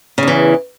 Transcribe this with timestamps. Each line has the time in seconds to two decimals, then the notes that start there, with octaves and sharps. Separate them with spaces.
0.18 C#3
0.23 E2
0.28 E3